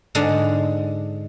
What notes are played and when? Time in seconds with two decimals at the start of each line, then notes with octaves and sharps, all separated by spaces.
0.15 G#2 D3 G#3 D4 F#5